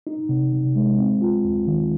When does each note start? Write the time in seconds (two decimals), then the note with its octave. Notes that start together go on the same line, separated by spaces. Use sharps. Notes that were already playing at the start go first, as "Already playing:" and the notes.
0.07 D#4
0.29 C3
0.52 C3
0.76 G#3
0.99 C4
1.21 F4
1.45 D#2
1.67 D#3